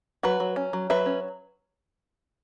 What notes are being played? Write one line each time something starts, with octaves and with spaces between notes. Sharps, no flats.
F#3 F#4 B4
F#3
C#4
F#3
F#3 B4 E5
C#4